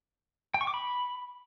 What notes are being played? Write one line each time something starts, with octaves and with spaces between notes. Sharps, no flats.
G5
C#6
D6
B5